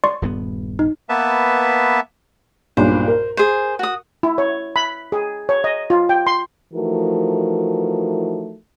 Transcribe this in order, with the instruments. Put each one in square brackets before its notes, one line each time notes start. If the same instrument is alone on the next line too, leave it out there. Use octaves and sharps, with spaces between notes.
[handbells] D5 C6 C#6
[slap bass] D#1 G2 B3
[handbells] D#4
[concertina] A#3 B3 B4 E5 A5
[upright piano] B1 G2 A#2 [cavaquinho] C5
[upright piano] A#4
[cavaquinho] G#4 C5
F#4 D#6
[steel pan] E4
C#5
B5
G#4
C#5
D#5
F4
G5
C6
[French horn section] E3 F3 A3 D#4 F#4 A#4